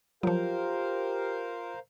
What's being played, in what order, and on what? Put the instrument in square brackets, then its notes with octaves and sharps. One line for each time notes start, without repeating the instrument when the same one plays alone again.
[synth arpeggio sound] F3 F#3 [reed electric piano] F4 [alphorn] G4 [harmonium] A#4 C5 F5